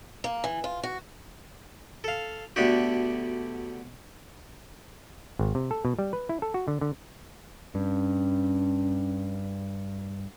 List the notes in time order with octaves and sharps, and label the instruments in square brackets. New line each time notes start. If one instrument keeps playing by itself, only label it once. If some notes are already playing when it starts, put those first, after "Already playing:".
[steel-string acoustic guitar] A#3
E3
F4
F#4
[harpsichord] A4 F5
D2 D3 B3 D4 F#4 G4
[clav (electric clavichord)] G#1
C3
A4
B2
G3
B4
E4
A4
F#4
D3
D3
[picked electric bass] G2 [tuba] C#4